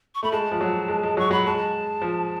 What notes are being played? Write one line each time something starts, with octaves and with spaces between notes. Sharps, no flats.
C#6
A3 B5
G#3 A5
F3
F#3
G#3
G#3
F#3 C#6
F#3 B5
G#3 A5
F3